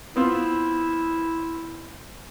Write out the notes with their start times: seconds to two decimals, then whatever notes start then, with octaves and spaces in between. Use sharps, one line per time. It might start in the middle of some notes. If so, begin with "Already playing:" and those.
0.16 B3 C4 E4 F4